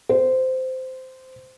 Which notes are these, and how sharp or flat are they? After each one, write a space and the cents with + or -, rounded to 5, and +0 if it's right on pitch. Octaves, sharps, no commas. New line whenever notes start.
C5 -15